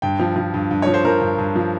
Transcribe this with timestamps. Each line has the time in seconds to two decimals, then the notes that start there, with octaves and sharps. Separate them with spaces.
0.02 G2 G5
0.19 F3
0.36 F3
0.54 G2
0.71 G2
0.82 F3 C#5
0.94 C5
1.04 F3 A#4
1.21 G2
1.38 G2
1.55 F3